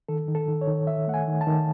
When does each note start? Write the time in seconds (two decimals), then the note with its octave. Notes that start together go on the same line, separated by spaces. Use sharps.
0.09 D#3 A4
0.28 D#3
0.35 A4
0.48 D#3
0.61 C#5
0.68 D#3
0.87 D#3 E5
1.07 A3 F#5
1.14 G#5
1.28 D#3
1.41 A5
1.47 D#3